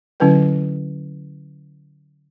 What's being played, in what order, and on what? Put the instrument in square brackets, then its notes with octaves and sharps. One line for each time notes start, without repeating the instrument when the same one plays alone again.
[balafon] D3 F#3 C#4 E4 B4 G5